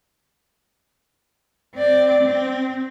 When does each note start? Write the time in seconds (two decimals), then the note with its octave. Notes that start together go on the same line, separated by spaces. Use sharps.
1.75 C4 D5
2.23 C4